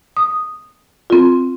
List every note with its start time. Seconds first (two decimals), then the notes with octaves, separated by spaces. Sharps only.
0.17 D#6
1.10 C4 F4